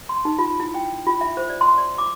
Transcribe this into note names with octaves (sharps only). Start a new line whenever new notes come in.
C6
D#4
F4
E4
G5
F4
E5
C5
D5
C6
D5
D6